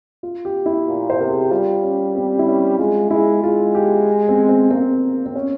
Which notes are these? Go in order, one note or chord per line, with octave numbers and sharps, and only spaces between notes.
F4
G4
E4
A#2
C5
C3 A#4
G#4
G4
G3 F4
C#4
C4
E4
C#4
G#3 F4
G#3 E4
G#3 F4
G4
C4
C4
A#3 C4
C4
C#4